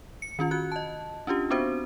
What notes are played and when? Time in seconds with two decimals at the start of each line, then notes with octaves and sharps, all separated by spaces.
0.22 C#7
0.39 D#3 C#4 F4
0.51 F#4 F#6
0.72 D#5 A5
1.27 C#4 D4 F4 G4
1.50 B3 C4 D4 F#4 C5